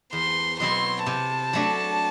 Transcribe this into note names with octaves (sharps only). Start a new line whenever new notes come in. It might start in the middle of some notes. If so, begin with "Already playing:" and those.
E2 C6
B2 F#3 C4 E4 C6
C3 A5
F#3 A3 D4